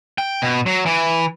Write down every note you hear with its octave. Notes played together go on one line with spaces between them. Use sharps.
G5
B2
F#3
E3